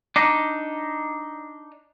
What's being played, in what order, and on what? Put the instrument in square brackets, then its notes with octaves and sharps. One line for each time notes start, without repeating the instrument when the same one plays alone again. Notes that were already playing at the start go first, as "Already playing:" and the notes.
[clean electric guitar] D4 D#4